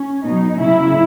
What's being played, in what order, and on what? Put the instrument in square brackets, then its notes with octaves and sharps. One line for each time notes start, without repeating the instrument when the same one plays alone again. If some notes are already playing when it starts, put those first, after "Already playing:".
Already playing: [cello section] C#4
B2 F#3 D#4
C#3 F#3 E4